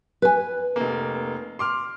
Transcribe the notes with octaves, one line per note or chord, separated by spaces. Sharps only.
B4 G#5
F1 A#3
C6 D6 F6